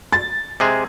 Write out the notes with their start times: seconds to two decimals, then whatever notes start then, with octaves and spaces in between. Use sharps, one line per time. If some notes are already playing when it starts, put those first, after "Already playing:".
0.12 A6
0.60 C3 G#3 G#4